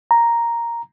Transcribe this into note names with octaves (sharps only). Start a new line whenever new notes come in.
A#5